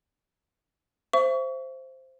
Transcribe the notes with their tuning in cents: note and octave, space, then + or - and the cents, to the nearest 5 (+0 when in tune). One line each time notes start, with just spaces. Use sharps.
C5 +0 E5 +30 C#6 +30